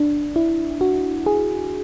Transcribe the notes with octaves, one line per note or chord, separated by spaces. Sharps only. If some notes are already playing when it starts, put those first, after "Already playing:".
Already playing: D4
E4
F#4
G#4